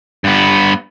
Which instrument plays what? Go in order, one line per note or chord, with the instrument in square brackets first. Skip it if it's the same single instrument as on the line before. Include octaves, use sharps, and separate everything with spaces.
[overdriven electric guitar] G2 B3